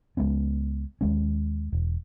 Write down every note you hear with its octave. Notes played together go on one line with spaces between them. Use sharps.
C#2 G#3 B3 C#4
D#2 G#3 C#4
E1